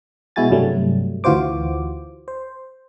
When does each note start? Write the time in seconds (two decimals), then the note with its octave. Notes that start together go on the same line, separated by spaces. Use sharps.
0.36 B2 G#3 E4 F#4 G#5 A6
0.51 G2 C3 F#3 G3 A3
1.24 D2 E3 F4 F#4 C5 D6
2.28 C5